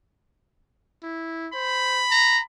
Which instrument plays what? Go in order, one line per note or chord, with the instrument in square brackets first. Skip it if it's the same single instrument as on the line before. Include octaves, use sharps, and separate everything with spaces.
[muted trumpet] E4
[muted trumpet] C5 [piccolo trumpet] B5
[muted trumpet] A#5